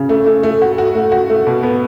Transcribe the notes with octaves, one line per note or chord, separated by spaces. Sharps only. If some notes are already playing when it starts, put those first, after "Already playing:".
Already playing: C#3
A3
A3
A3
F#4
F#4
A3
F#4
A3
B2
B3